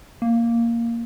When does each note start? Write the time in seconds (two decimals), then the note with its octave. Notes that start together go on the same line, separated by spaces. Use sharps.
0.22 A#3